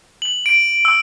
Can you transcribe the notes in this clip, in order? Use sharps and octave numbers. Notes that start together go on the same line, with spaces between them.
F#7
D7
E6